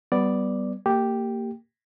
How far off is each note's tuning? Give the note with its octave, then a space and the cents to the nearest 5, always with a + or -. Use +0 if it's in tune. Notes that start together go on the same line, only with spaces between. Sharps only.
G3 -25 B3 +0 D5 +0
A#3 -25 G4 +0 G5 +0